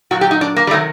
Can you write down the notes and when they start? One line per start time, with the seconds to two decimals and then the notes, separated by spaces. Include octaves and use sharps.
0.11 A#2 F#3 F#4
0.21 G4
0.31 D#4
0.41 D4
0.56 A#3
0.67 G3
0.71 C3 D#3 F#3 A3